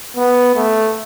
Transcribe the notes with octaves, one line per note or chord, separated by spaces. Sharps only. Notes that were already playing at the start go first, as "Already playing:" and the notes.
B3
A3